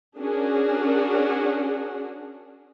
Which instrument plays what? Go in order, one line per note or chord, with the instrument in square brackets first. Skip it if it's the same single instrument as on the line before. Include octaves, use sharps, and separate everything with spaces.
[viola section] C#4 D4 F#4 G#4 A#4